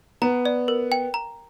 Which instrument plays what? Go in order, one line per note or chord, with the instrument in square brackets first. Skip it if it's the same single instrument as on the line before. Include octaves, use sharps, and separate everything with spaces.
[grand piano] B3 [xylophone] A#5
[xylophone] D5
A#4
G5
A#5